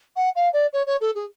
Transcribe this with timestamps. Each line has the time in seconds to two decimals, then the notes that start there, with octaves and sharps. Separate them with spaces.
0.16 F#5
0.35 F5
0.53 D5
0.73 C#5
0.86 C#5
1.01 A4
1.15 G#4